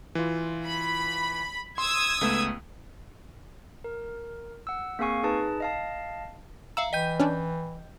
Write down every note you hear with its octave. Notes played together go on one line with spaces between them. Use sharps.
E3 F4
B5
C6 D#6 E6 G#6
C#2 A3 B3
A#4
F#5 E6
A#3 C4 G#4 F5 G#5 C#6
D#4 G#4 B4 A5
D#5 F5 A5
E5 F5 A#5 E6
E3 D#5 G5 G6
C#4 D4